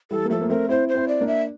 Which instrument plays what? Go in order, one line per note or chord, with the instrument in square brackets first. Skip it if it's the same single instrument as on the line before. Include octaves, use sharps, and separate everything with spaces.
[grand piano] E3 G3 [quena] A4
[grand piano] A#3
[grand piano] F3 A3 [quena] A4
[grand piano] A#3
[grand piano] A3 C4 [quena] A#4
[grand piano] C4 E4 [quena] C5
[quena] C5
[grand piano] C4 E4
[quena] D5
[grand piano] A#3 D4
[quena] E5